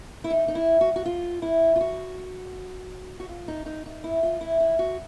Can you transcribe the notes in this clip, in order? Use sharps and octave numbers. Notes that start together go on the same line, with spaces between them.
E4
D#4
D#4
E4
F#4
F#4
F4
E4
F4
F#4
F#4
F4
D#4
D#4
D#4
E4
F4
E4
E4
F#4